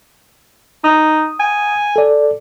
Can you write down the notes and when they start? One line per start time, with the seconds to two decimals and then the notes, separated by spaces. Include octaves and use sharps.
0.84 D#4 D#6
1.40 G#5
1.96 A4 D5